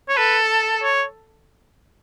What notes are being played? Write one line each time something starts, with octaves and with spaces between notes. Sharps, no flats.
C#5
A4 B4
C#5